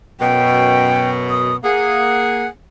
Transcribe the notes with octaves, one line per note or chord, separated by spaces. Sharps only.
F#2 B2 G5
D#6
A#3 G#4 F#5